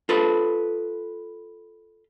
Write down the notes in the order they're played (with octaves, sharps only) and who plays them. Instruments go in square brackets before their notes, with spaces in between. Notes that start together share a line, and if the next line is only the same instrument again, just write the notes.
[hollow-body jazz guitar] F4 A4 B4